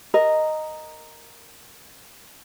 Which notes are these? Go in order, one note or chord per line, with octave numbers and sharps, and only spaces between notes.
A#4 D#5